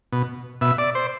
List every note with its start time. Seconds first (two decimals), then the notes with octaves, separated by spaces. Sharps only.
0.12 B2
0.61 B2 E5
0.78 D5
0.95 C5